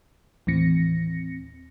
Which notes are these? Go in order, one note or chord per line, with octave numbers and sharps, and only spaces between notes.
D#2 A2 E3 C4 A#6 C#7